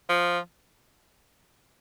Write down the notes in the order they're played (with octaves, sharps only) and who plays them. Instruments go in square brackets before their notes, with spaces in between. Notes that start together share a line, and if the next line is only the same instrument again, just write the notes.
[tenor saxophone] F3